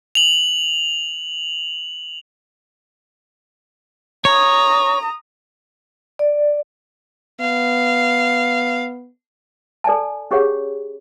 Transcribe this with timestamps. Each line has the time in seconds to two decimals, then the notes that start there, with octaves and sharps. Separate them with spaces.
0.15 F7 F#7
4.25 C#5 A#5 D#6
6.19 D5
7.40 B3 F5
9.84 A4 D5 G#5 A5
10.31 C#4 G4 G#4 C#5 F#5